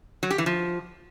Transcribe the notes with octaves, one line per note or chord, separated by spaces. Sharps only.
F#3
G4
E3
F3